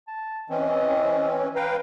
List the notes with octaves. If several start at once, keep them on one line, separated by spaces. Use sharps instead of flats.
A5
E3 C4 C#4 D#5
C#5
B4 F5 G5 A#5